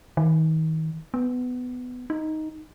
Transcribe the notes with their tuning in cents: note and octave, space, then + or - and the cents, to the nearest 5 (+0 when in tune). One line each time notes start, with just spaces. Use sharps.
D#3 +35
B3 +15
D#4 +5